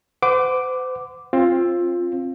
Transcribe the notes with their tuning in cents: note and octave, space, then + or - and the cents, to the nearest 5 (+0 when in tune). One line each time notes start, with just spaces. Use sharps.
C5 -45 F#5 +0 D6 +0
C4 +20 F4 +0